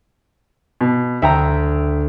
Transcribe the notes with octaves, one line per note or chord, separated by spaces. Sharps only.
B2
D2 E5 G5 A#5